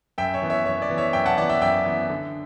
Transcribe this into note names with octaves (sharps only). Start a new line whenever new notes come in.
F#2 E5 G5
C#5 E5
E3 B3
C#5 E5
F#2 C#5
D5
E3 B3
C#5 E5
F#2 E5 G5
F#5 A5
E3 B3 D5 F#5
E5 G5
F#2 E5 G5
E3 B3
D3